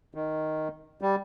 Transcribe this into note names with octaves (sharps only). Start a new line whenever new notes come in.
D#3
G3